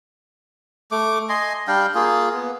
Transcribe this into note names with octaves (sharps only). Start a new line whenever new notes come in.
A3 D6
D#5 G#5 C6
G3 D4 F5 G5
A#3 F4 G#4
B3